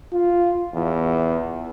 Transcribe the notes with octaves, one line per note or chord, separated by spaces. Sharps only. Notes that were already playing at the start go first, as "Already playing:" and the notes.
F4
E2